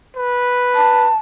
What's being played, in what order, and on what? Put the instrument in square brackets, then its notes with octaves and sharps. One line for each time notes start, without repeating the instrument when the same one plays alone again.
[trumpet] B4
[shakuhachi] A5